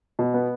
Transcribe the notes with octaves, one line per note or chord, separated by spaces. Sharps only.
B2
B3